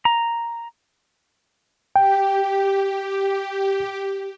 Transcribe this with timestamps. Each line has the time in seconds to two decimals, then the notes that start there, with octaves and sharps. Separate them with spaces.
0.05 A#5
1.96 G4 G5